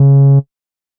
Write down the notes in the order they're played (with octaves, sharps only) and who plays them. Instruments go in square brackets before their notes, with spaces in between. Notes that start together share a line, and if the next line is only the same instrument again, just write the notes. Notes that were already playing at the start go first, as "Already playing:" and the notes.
Already playing: [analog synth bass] C#3